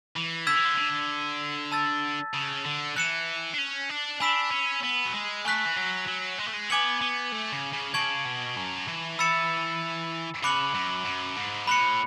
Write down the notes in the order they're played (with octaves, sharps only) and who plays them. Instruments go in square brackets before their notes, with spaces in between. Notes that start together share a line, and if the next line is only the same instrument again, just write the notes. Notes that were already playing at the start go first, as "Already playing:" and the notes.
[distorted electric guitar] E3
[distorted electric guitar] D3 [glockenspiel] E6 G#6 B6 E7
[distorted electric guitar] E3
D3
D3
[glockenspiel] A5 E6 A6
[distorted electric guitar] C#3
D3
[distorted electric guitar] E3 [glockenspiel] F#6 C#7 E7
[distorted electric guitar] D4
C#4
D4
[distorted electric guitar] D4 [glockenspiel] G#5 B5 E6 B6 E7
[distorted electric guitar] C#4
B3
F#3
G#3
[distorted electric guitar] A3 [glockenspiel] G#5 C#6 F#6 B6
[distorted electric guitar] E3
F#3
F#3
G#3
A3
G#3
[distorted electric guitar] B3 [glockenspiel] G#5 D6 G#6 C#7 F#7
[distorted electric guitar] B3
A3
C#3
C#3
[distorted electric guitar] C#3 [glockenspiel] A5 C#6 G#6 D7 F#7
[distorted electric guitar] B2
F#2
E3
[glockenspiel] B5 E6 A6 C#7 E7
[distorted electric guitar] C#3 [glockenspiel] B5 D6 F#6 C#7 F#7
[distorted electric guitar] F#2
F#2
G#2
[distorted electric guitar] A2 [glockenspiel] B5 F#6 C#7